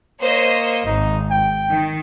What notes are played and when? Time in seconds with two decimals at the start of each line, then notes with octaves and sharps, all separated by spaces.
0.21 A#3 C5 C#5 D#5
0.86 G#1 D#4
1.30 G5
1.69 D#3